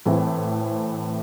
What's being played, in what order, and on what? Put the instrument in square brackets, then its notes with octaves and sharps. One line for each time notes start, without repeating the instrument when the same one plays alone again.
[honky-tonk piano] A2 E3 A3 C4 E4